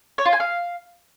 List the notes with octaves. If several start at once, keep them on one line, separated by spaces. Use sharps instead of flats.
C#5
F4
G#5
F5